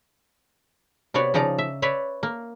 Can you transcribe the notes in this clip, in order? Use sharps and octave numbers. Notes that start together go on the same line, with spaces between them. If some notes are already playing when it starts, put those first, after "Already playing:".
C3 B3 F#4 C#5 D5
C#3 F3 D#4 D5 A#5
E5
B4 C#5 D5 E5
A#3